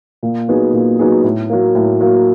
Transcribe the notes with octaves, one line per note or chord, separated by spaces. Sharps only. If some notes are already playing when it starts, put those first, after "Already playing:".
A#2
F#3 B3 D#4 G#4
A#2
F#3 B3 D#4 G#4
A2
F#3 A#3
A2
F#3 A#3